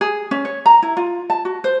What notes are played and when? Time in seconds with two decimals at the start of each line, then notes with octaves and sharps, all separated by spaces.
0.01 G#4
0.31 C#4
0.45 C#5
0.66 A#5
0.82 E4
0.97 F4
1.30 A5
1.45 F#4
1.64 C5